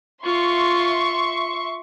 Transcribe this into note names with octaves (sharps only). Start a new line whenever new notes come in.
F4 E5 C6 C#6